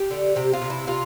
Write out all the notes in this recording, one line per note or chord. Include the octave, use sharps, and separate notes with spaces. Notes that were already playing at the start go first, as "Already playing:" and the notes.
Already playing: G4
D3
C3 G4
F4
C3
E4
C3 F4